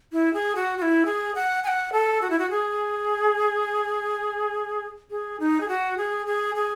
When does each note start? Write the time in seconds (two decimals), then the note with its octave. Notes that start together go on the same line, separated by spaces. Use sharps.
0.12 E4
0.34 G#4
0.56 F#4
0.78 F#4
0.82 E4
1.06 G#4
1.35 F#5
1.64 G#5
1.68 F#5
1.93 A4
2.22 F#4
2.30 E4
2.39 F#4
2.50 G#4
5.11 G#4
5.40 D#4
5.61 G#4
5.68 F#4
5.98 G#4
6.26 G#4
6.55 G#4